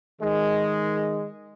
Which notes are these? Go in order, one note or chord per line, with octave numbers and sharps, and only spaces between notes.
D#3 G#3